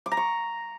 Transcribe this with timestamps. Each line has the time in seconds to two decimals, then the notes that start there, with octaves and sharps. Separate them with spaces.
0.06 D6
0.12 A#5
0.17 C#6